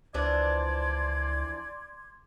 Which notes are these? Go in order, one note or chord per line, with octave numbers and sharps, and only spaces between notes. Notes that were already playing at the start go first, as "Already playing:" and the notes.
C#2 E3 F3 D4 D5 C6 D6 G#6